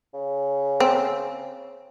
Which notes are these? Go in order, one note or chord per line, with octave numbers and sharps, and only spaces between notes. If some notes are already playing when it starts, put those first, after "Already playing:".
C#3
C4